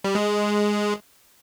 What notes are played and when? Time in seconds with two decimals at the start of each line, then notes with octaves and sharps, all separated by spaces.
0.04 G3
0.15 G#3